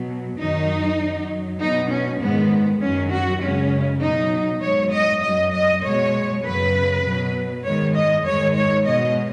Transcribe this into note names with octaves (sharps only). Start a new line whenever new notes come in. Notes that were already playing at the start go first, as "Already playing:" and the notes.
Already playing: B2 F#3
F#2 D#3 F#3 D#4
F#2 F#3
B2 F#3 D#4
C#4
G#2 D#3 G#3 B3
F#2 D#3 F#3 C#4
F#4
F#2 C#3 G#3 C#4
B2 F#3 D#4
G#2 F#3 C#5
D#5
F#2 F#3 D#5
D#5
B2 G#3 C#5
F#2 C#3 F#3 B4
B2 F#3
G#2 D#3 G#3 C#5
D#5
G#2 D#3 G#3 C#5
C#5
B2 G#3 D#5